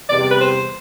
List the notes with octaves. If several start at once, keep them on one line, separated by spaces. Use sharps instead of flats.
E2 C3 E3 G3 D5
B4
C5